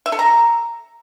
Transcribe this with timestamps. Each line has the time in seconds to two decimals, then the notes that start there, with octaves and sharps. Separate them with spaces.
0.06 E5
0.12 A4
0.19 A#5